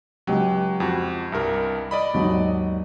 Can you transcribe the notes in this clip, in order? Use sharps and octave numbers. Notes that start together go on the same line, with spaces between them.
C#2 F#3 G4
F2 F#4
C2 G2 A#4
D5 D#5 B5
G#1 D#2 F#3